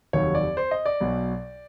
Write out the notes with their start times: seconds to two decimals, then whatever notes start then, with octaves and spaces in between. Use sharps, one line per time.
0.13 F1 D#2 D#3 F#3 C#5
0.35 D5
0.57 C5
0.71 D#5
0.86 D5
1.01 B1 B2 F#3